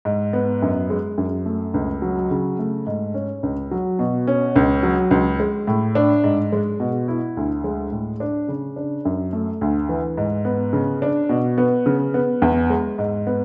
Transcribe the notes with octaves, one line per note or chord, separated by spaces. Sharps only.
G#2
B3
F#2
G#3
F#2
A3
C#2
F#3
C#3
A3
G#2
C#4
C#2
F#3
B2
C#4
C#2
F#3
C#2
G#3
A2
D4
G#2
G#3
B2
E4
D2
G#3
A2
D4
C#3
D4
F#2
A3
D2
E3
G#2
B3
C#3
D4
B2
B3
C#3
B3
E2
G#3
G#2
B3